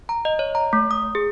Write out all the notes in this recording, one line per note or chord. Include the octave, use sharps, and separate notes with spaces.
A#5
D#5
C#5
A#5
A3
D#6
G#4